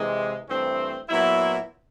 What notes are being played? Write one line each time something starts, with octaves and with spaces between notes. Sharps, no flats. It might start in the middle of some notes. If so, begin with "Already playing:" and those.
Already playing: C3 E3 G#3
G2 E3 A3 C4
A#2 F#3 B3 E4